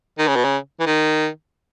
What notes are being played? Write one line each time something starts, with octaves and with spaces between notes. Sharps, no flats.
D#3
C#3
B2
C#3
E3
D#3